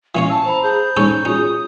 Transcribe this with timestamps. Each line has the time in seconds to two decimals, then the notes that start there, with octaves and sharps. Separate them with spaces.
0.15 E3 C#4 C#5 F5
0.30 A5 E6
0.46 C5 A#5 B5
0.63 G#4 G6
0.97 C#4 D#4 A4 C#5
1.25 C#4 F4 F#4 G#4 D#6